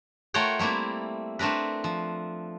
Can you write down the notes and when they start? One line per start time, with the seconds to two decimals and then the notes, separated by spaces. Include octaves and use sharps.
0.34 A3 F4 A#4 C#5 F#5 G5
0.59 G3 A3 A#3 C4 E4
1.39 A3 C4 D4 A#4 B4
1.84 F3